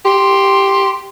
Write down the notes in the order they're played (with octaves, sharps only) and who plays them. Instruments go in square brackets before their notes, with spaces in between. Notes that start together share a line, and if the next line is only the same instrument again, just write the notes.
[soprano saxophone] G4 [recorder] C6